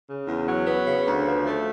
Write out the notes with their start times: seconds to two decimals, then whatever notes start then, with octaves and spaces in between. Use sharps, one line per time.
0.07 C#3
0.27 E2
0.46 F#3
0.66 B3
0.85 C#3
1.05 D2
1.25 F3
1.45 A3